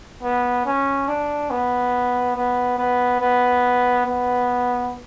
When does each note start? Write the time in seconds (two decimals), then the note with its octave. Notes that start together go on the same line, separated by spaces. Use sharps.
0.23 B3
0.65 C#4
1.08 D4
1.50 B3
2.36 B3
2.78 B3
3.21 B3
4.06 B3